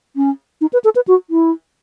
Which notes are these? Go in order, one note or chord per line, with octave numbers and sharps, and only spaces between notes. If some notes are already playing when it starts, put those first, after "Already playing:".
C#4
D#4
B4
A4
B4
F#4
E4